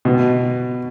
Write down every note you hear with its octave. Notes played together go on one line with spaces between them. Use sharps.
B2